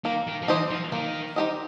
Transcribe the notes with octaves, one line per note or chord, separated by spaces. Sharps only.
D#3 A#3
D#3
F3
E3 D#4 G4 C5 D#5
F3
D#3 A#3
D#4 G4 C5 D#5